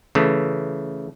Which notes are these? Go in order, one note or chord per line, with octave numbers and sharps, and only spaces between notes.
C#3 E3 A3